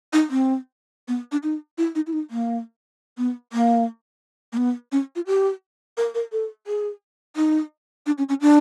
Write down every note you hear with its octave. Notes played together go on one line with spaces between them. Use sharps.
D#4
C4
B3
D4
D#4
E4
D#4
E4
D#4
A#3
B3
A#3
A#3
B3
C#4
F4
G4
A#4
A#4
A4
G#4
D#4
D4
C#4
C#4
D4